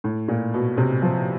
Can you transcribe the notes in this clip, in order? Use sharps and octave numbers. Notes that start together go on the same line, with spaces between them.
A2
A#2
B2
C3
F3